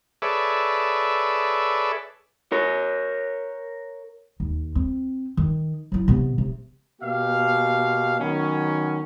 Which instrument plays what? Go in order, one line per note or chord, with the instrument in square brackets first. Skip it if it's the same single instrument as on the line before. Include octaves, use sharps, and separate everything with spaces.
[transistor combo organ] G#4 A4 B4 C#5 D5 E5
[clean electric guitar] A#4 C#5
[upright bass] D#2
C4
D#3
F#3 E4
C3 B3
C3
[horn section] B2 A#3 G4 F5
D#3 F#3 B3 C#4